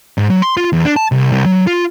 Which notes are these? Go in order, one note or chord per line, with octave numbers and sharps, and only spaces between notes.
G#2
F#3
C6
F4
E2
D4
A5
C2
C2
F#3
F4